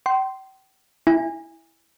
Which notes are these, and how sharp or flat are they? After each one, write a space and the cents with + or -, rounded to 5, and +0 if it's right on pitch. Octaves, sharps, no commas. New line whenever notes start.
G5 -35 C6 +0
E4 +0 G#5 -25